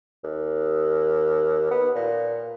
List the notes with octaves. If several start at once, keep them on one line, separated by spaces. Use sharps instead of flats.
D#2
B3
A#2